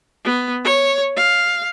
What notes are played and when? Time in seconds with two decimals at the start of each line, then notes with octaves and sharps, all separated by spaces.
0.24 B3
0.64 C#5
1.17 F5